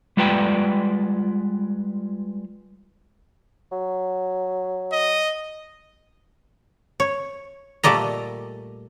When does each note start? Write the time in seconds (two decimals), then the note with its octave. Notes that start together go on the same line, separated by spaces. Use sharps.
0.17 G3 G#3 F4 B4 D5 G5
3.72 F#3
4.92 D#5
7.00 C#5
7.83 A#2 G3 A3 D5 D#5 A#5